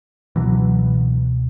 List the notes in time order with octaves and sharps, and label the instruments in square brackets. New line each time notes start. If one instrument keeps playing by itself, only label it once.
[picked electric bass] C#2 B2 E3 F#3